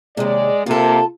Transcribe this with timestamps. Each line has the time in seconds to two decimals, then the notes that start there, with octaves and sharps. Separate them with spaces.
0.17 D#2 C3 G#3 D5
0.66 C3 A#3 F4 A4